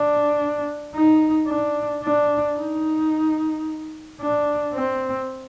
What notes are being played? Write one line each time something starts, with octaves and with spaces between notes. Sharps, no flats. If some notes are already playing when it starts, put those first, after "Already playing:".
Already playing: D4
D#4
D4
D4
D#4
D4
C4